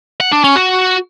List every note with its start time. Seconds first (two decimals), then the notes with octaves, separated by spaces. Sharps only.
0.21 F#5
0.32 D4
0.44 C#4
0.56 F#4